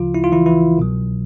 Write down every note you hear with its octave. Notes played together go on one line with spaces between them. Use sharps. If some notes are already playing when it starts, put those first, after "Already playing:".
Already playing: D2 C#3 F3 F4
E4
F4
E3 E4
E3 E4
C2 B2 F#3